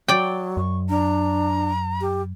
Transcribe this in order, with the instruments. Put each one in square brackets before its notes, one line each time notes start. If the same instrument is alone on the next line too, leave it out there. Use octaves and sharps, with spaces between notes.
[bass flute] F#3 [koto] D5 G5
[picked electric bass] F#2 [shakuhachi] C#6
[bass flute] D4 [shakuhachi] A#5
[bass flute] G4